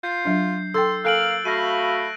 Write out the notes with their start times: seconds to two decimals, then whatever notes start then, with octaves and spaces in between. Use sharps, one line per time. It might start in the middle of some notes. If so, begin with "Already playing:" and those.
0.03 F4 G6 C7
0.25 F#3 D4
0.74 A4 G5 C6 E6 A6
1.05 A#3 A4 F5 G#5 F#6 D7 F#7
1.45 A3 F#4 F5 B5 A#6 D#7